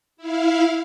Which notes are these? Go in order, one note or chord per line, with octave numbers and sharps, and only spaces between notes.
E4 F5